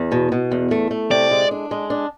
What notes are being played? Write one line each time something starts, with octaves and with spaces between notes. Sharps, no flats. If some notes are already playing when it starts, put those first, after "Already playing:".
Already playing: E2
B2
B2
E2
A3
A3
C3 D5
G#3
D4
G#3
D4